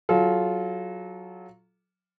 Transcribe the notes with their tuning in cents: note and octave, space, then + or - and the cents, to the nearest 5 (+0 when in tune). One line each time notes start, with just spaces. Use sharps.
F#3 +0 F4 +0 A4 -35